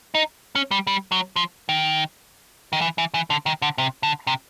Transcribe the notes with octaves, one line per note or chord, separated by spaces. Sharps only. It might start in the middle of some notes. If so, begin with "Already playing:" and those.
D#4
C#4
G3
G3
F#3
F3
D#3
D#3
E3
E3
E3
D3
D#3
D3
C3
D3
C3